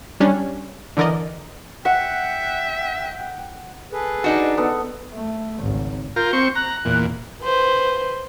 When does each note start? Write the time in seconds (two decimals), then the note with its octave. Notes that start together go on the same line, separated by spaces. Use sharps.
0.20 G3 C#4 D4
0.97 D3 E3 A#4 D5 D#5
1.85 E5 F#5 G5
3.92 G#4 A4 B4
4.24 D4 D#4 F#4
4.57 B3 A4
5.14 A3
5.60 G#1 C#2
6.16 F4 A#4 G6
6.33 C4 C#6
6.55 A#5 F#6
6.85 E2 A#2
7.43 B4 C5